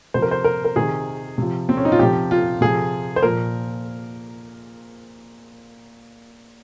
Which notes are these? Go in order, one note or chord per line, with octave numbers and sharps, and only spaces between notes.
C3 F3 C5
A#4
C5
A#4
A#4
C3 D#3 G#4
C3 F3
C4
C#4
D#4
F4
C3 F3 G4
F4
C3 F3 G#4
C5
A#2 F3 A#4